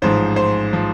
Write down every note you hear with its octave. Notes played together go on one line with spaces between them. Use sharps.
A1 G#2 F3 C5
C5
F3